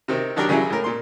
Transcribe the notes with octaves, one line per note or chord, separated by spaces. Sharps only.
C3 D#3 C4
D#3 F#3 D4 G4 A#4
C#3 F#3 G3 C#4 E4
A2 A#4
A#2 C6